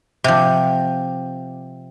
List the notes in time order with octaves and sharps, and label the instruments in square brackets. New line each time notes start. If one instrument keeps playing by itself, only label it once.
[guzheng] C3 F3